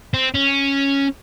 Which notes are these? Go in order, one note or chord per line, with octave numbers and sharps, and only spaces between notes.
C4
C#4